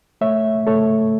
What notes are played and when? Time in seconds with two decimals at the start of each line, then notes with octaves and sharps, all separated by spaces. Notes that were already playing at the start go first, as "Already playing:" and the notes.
0.21 A3 C#5 E5
0.67 A3 A4 C#5